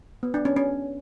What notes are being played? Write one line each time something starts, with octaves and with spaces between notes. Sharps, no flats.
B3
D4
C#4
C#4